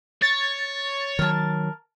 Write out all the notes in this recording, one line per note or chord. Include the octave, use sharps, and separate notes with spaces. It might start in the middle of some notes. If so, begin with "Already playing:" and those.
C#5 A6
D#3 F#3 A#4 A5